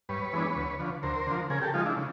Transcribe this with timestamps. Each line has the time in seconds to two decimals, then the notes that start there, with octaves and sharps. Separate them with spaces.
0.09 G2 B4 C#5
0.33 E3 G#3 B3 D4
0.56 D2
0.80 D3 F3
1.03 D2 A#4 C5
1.27 D3 F3
1.50 C#3 G#4 A#4
1.62 G4 A4
1.74 F3 G#3 D#4 F4
1.86 D4 E4
1.97 C#3